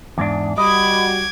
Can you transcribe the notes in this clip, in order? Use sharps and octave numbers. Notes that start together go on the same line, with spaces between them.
E2 G#2 D4
G3 F#4 D#5 B5 D6 G#6